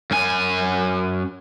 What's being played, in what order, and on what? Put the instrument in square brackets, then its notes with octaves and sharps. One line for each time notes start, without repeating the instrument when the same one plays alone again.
[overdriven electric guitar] F#2 G#5